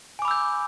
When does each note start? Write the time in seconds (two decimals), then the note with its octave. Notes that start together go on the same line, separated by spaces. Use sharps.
0.19 G#5
0.22 D6
0.25 B5
0.28 E6
0.31 G6